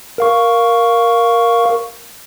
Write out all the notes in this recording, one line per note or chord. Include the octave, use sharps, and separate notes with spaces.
A#4 F5 C#6